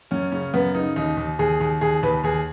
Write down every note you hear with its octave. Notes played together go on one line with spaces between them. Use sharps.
F#2 C#4
C#3 C#4
F#2 B3
C#3 D#4
D#2 D#4
D#2
D#2 G#4
D#2
D#2 G#4
D#2 B4
D#2 G#4